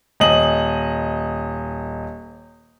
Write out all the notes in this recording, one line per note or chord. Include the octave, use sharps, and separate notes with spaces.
D#1 D#5 F#7